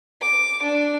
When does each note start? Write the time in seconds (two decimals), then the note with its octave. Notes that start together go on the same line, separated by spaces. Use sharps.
0.22 D6
0.62 D4